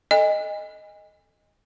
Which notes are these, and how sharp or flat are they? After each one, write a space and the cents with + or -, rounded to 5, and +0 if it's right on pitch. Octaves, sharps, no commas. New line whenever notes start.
A4 +0 D#5 +0 G#5 -35